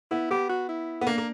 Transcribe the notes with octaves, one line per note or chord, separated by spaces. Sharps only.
B3 E4
B3 G4
F#4
E4
B3
A#3 D4
A#3